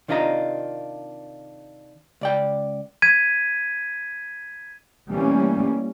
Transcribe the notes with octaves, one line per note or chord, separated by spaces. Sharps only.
C3 D#3 D4 F4 D#5 A#5
C#2 D5 G5
G#6 B6 D#7
E3 G3 A3 A#3 C4 C#4